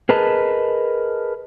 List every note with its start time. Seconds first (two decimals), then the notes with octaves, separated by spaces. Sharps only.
0.09 G#4 A#4 B4 D#5 A5